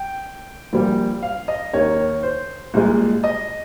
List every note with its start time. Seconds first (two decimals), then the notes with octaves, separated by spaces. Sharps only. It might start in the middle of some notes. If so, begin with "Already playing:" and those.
Already playing: G5
0.73 A#1 A#2 G3 A#3
1.23 F5
1.48 D#5
1.73 D#2 D#3 A#3 C#5
2.23 C5
2.74 C2 A#2 G#3
3.24 D#5